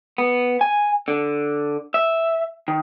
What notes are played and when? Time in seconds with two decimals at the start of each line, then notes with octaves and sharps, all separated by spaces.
0.18 B3
0.61 G#5
1.08 D3
1.94 E5
2.68 D#3